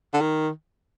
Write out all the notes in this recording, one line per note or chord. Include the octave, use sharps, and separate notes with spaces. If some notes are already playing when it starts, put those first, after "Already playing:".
D3
D#3